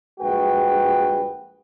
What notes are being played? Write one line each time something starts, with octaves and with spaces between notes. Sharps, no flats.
A#1 G2 G#3 F#4 B4 G5